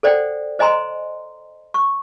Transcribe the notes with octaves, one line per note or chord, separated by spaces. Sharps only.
A4 C5 D5 F#5 G5
C5 D#5 G#5 A#5 C6
C#6